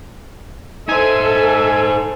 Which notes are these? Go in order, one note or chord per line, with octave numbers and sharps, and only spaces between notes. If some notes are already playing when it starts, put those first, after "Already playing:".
D#4 A4 C5 E5 G#5